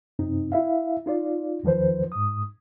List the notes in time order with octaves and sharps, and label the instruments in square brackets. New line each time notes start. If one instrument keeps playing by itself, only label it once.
[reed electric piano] F#2 C3 C4 D#4
E4 E5 F5
D#4 F4 D5
E2 D#3 F3 B4 C5
G#2 D#6